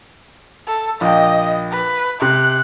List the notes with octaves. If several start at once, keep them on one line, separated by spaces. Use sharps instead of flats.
A4
A#1 D#5 G5
B4
C3 F#6